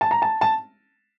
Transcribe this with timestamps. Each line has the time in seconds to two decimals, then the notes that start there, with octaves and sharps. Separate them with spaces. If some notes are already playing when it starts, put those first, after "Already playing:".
0.01 A5
0.11 A#5
0.22 A5
0.41 A5